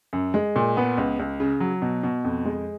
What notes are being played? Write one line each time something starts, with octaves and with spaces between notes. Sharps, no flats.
F#2
G#3
A#2
B3
C#2
C#2
C#3
F#3
B2
B2
F2
G#3